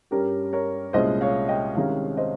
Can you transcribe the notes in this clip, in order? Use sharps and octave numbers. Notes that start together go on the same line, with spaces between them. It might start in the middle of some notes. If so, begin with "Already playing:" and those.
G2 G3 C#4 G4 A#4
A#4 C#5
C2 A#2 G#3 C#4 C5 D#5
C#5 F5
D#5 G5
C2 C3 D#3 G#3 C#4 C#5 F5
C5 D#5